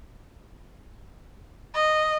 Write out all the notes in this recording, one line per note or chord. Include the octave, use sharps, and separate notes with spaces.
D#5